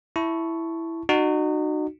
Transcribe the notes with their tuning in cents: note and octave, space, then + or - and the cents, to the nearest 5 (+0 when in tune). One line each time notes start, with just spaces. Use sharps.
E4 +0 A5 +0 C#6 +0
D#4 -35 F#4 +0